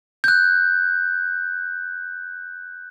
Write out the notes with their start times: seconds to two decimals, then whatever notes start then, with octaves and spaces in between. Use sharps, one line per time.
0.24 F#6 G6